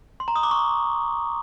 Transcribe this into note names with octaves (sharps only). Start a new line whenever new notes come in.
C6
A#5
D#6
D6
C#6